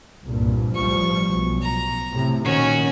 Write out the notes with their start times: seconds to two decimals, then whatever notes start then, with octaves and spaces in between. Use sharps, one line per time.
0.25 C2 G2 A#2
0.75 A1 F3 G3 C#6
1.29 B1
1.62 A#5
2.11 A2 C3
2.45 A#2 D#3 C#4 F#4